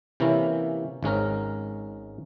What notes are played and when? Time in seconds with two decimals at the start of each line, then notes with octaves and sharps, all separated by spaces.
0.20 C3 E3 A#3 C#4 E4
1.03 G#1 G#2 C#4 A#4